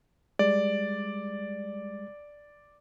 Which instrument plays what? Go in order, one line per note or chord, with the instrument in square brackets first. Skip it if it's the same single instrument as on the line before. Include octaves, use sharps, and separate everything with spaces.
[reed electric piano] G3 G#3 [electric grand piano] D5